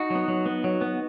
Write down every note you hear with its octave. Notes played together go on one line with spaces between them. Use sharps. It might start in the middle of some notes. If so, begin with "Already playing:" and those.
Already playing: D#4 F#4
F#3 B3
F#3
B3
F#3
B3